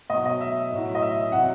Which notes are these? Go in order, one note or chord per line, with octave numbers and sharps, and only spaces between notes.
B2 F#3 D#5
D#5
E5
A2 F#3
D#5
E5
C3 F#3 F#5